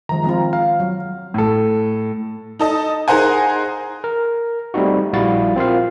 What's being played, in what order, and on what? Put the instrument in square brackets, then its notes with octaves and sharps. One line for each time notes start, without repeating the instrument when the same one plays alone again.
[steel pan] D#3 F3 G#3 [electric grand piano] A#5
[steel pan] F3 C4 F4
[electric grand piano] F5
[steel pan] F#3
[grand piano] A2 A4
[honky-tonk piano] D#4 A4 D#5
D#4 G#4 A#4 C5 F#5 G#5
[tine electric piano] A#4
G3 A3 C4 D#4 F#4
A#1 G3 E4 F#4 F5 A6
C4 F4 A#4 F5